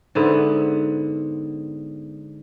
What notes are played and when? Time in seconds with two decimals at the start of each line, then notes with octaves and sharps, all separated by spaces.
0.15 G#2 D3 B3 E5